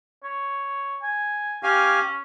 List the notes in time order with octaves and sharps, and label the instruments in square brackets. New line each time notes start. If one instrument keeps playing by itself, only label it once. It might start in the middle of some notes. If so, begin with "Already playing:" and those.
[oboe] C#5
G#5
[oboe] C#4 [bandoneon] G4 F5 G#5